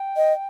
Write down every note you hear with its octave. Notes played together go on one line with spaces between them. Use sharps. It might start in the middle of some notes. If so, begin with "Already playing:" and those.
Already playing: G5
D#5